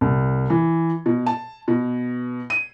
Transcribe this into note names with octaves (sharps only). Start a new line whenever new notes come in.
C2
E3
B2
A5
B2
D#7